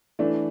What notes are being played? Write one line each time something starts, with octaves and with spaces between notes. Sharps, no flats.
E3 A3 D4